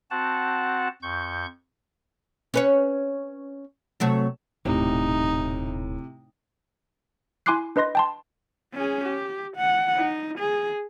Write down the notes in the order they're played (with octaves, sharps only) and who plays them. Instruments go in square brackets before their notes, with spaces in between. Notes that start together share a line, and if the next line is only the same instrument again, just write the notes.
[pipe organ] C4 F#4 F#5 A5
F2 C#6 G6
[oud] C#4 B4 C#5
C3 F#3 A3
[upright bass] D#1 [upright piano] A2 [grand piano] C3 [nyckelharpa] D#4
[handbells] E4 G#5 C6 D6 F#6 C7
D4 B4 D#5 C6 A#6
G5 A5 C6
[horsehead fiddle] C#4 G#4
G4
F#5
D#4
G#4